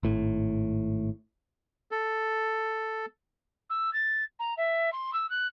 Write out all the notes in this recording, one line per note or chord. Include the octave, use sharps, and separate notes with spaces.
G#1 A2
A4
E6
A6
A#5
E5
C6
E6
F#6